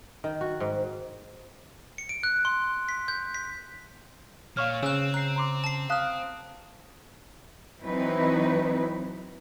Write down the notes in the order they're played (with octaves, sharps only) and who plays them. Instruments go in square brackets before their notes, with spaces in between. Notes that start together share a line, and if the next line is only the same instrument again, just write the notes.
[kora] D#3
F#4
G#2
[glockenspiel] C#7
D7
F#6
C6
B6
G6
B6
[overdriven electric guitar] A#2 [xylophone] C#5 [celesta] F5 C#6 F6
[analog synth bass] C#3 [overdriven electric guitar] C4 [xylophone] E6 F#6
[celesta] A#5 C7 [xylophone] F#6
[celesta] A#5 C6 D6
[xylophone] A5 C7
[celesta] F5 D#6 F#6 [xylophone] A5 F6
[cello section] E3 F#3 C4 D#4 E4 B4